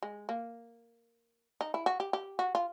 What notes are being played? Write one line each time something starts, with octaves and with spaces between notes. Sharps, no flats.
G#3
A#3
D#4
E4
F#4
G4
G4
F#4
F4